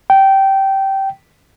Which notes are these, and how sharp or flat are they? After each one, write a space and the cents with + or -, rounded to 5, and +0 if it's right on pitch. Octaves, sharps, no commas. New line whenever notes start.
G5 -15